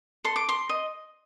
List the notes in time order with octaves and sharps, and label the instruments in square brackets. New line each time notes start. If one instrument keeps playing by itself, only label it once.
[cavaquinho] A4 C6
D6
C6
D#5